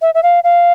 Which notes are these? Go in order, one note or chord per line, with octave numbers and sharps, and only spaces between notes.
E5
E5
F5
F5